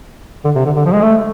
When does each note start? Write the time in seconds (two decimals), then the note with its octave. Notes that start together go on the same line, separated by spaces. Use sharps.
0.45 D3
0.56 C3
0.66 D3
0.77 D3
0.86 F3
0.94 G#3
1.02 A3